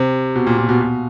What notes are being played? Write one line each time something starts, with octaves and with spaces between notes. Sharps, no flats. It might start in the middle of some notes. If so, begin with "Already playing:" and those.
Already playing: C3
B2
A#2
A#2
B2
B2